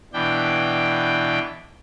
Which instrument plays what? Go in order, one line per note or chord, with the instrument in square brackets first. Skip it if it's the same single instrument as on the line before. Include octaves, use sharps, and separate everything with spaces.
[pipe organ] B2 E3 D4 G5